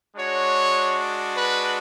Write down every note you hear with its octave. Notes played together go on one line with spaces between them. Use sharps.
G#3 D4 F#4 C#5
B4